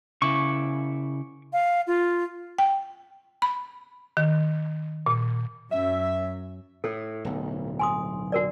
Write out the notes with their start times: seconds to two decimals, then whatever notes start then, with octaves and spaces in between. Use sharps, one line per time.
0.22 C#3 E4 C#6 D6
1.52 F5
1.87 F4
2.58 G5
3.42 B5
4.17 D#3
5.06 A#2
5.71 F#2 E5
6.84 A2 A4
7.25 D1 B1
7.79 G#5 C6 D#6
8.32 F#4 A#4 D5